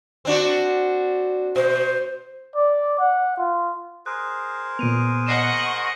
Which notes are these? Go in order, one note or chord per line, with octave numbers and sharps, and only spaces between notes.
C4 D4 F#4
B2 C5
D5
F#5
F4
G#4 A#4 C5 F#6
A#2 B3 D7 D#7 F7
D#5 F#5 C#6 A#6 C7 E7